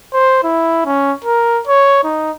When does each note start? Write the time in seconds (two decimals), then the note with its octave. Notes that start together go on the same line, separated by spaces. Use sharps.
0.13 C5
0.43 E4
0.85 C#4
1.24 A#4
1.67 C#5
2.04 D#4